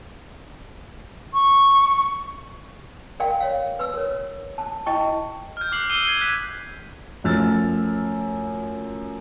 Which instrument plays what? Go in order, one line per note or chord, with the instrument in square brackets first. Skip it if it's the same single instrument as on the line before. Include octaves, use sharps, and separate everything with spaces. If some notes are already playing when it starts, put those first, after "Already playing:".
[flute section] C#6
[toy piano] A#4 D5 F5 G5 C6
C#5 F5
B4 C6 E6
A#4 C#5
A5
E4 D#5 G5 A5 C#6
[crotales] F6 G6
D6 F#6 C7 F#7
D#6 E6 C7 D7 D#7 G7
G#6 C7 C#7 D#7 F#7
F#6 G#6 B6 D#7
[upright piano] F#2 F3 A3 E6 F6 A6